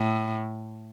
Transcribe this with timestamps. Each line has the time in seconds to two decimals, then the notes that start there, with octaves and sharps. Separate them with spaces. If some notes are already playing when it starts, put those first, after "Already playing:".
Already playing: A2